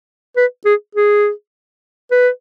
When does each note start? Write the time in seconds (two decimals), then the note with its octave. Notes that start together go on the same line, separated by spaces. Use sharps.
0.36 B4
0.65 G#4
0.95 G#4
2.11 B4